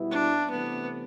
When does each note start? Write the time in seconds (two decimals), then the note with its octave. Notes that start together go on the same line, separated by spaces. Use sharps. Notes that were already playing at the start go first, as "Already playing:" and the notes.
Already playing: B2 G3 B3 E4
0.11 D4
0.49 C3 E3 A3 B3